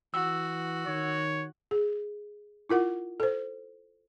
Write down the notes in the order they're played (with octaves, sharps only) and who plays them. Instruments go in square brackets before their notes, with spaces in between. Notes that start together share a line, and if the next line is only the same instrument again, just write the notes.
[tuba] E3 [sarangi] F#4 [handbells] E6
[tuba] D#3 [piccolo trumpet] C#5
[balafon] G#4
E4 F4 A#4 F#5
A4 C5